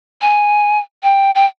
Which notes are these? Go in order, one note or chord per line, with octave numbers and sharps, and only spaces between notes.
G#5
G5
G5